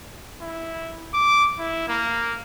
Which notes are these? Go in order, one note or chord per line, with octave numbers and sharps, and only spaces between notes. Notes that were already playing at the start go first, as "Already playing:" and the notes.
E4
D6
E4
A#3